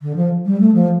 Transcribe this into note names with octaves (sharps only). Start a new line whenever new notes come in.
D3
F3
G3
A3
F3